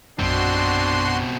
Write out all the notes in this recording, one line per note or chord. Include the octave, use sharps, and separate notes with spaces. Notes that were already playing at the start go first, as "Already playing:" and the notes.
A#1 F#2 B2 C4 D4 F#4 C6